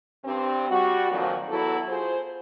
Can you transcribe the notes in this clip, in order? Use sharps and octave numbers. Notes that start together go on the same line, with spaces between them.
G2 C4
G3 F#4
F2 A#2 D#3 F3 F#3
E2 F#3 E4 F#4 A4
F4 G#4 C5